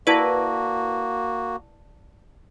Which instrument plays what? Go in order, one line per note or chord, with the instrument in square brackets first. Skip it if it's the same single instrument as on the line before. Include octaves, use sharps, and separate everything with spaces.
[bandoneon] A#3 F#4 [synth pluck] E4 B4 [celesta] D5 A5 A#6